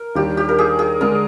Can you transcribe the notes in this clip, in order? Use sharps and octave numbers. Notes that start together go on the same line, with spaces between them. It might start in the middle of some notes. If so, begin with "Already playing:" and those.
Already playing: A#4
D#2 D#3 G3 D4 G4
G4
A#4
G#4
G#4
D3 G#3 D4 A#4